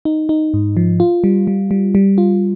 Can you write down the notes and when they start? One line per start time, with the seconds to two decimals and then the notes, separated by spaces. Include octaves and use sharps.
0.05 D#4
0.29 D#4
0.54 G#2
0.77 F3
1.00 F4
1.24 G3
1.47 G3
1.71 G3
1.95 G3
2.18 F4